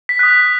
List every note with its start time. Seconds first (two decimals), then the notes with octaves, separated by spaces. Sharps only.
0.09 B6
0.19 D#6 F#6 B6